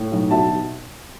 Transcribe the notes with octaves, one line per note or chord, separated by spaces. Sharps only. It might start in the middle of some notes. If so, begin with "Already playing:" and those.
Already playing: A2
B1
B2 E5 A5
B2